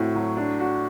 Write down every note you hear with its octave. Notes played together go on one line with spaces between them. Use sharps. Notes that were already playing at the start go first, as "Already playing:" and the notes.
Already playing: A2 A3 C4 F#4
F#3
D4
F#4